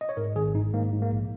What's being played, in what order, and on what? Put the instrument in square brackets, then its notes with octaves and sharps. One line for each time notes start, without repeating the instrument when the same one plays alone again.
[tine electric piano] D#5
C#5
G#2 A#4
G#1 G#4
G#2 D#4
G#2 A#3
G#2
A#3
A#1